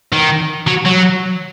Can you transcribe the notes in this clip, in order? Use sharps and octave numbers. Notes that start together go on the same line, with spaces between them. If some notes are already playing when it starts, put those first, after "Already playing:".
D#3
F#3
F#3